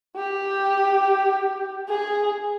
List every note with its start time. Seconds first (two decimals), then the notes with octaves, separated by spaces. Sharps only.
0.16 G4
1.89 G#4